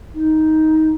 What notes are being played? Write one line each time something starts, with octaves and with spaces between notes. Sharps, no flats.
D#4